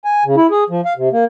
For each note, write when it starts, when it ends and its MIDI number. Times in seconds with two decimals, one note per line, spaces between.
0.04 0.24 80
0.25 0.36 49
0.37 0.47 64
0.51 0.64 68
0.70 0.81 53
0.85 0.93 77
0.97 1.09 48
1.13 1.24 58